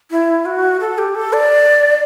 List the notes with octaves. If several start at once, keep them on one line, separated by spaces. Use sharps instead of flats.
E4
F#4
A4
G4
A4
D5